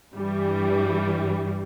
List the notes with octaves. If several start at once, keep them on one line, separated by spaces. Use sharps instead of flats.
G2 E3 G3